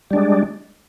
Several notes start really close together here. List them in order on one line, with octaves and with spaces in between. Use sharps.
G3 D4 G#3